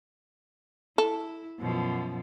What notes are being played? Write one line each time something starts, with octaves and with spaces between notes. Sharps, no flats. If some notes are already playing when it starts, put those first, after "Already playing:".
E4 A4
F#2 B2 F3